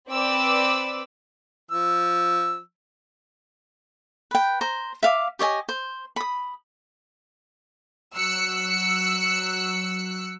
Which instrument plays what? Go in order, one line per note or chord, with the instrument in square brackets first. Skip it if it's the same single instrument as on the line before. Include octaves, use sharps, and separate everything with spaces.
[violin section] C4 B4 D5 D6 E6
[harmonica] F3 E6
[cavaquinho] B4 G5
C5 A#5
E5 F5 D6
G4 C#5 D#5 G#5
C5
B5 D#6
[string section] F#3 E6 F#6 C#7